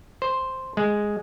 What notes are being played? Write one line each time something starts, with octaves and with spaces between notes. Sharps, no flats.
C5
G#3